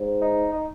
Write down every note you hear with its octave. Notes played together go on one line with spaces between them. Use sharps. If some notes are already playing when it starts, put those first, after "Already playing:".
Already playing: G#2
D#4
D#4